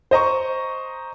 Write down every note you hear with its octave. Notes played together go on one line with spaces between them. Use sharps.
C5 D#5 A#5 C#6